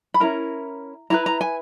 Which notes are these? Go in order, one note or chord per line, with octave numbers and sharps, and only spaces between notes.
B5
C#4 E4 A#4 A#5
E4 G#4 B4 A#5
A#5
G#5